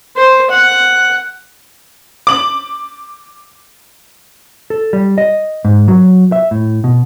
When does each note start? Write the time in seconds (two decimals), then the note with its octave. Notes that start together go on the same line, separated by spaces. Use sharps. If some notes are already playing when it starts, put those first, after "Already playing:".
0.16 C5
0.51 F#5
2.27 D6 F#7
4.70 A4
4.93 G3
5.18 D#5
5.65 G#2
5.88 F#3
6.32 E5
6.51 A2
6.84 B2